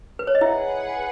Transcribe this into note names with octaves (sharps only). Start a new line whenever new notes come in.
B4
C#5
D#5
E4 G#4 B4 E5 F#5